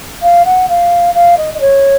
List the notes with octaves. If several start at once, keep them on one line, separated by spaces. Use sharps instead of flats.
F5
F#5
F5
F5
D#5
D#5
C#5